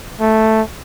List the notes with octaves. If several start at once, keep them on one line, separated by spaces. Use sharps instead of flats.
A3